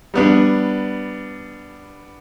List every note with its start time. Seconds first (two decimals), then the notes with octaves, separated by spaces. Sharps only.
0.14 G3 B3 D4